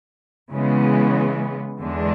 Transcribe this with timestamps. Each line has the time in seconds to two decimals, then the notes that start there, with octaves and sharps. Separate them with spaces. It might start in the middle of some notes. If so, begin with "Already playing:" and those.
0.51 C#3 E3 G#3 B3
1.80 E2 D3 G#3 D4